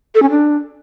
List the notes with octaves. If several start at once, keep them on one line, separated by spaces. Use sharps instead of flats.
A4
C#4
D4